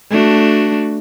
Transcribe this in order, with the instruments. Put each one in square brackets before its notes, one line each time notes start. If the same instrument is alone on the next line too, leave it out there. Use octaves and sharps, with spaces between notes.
[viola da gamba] A3 D4 F#4